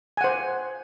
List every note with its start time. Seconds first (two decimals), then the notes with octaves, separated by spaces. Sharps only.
0.17 G#5
0.21 F#5
0.24 C5